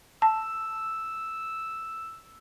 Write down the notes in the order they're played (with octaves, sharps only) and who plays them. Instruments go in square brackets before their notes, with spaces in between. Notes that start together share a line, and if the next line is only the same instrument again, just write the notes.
[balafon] A5 [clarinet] E6